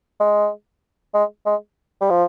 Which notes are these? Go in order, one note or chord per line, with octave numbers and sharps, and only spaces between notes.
G#3
G#3
G#3
G3
F3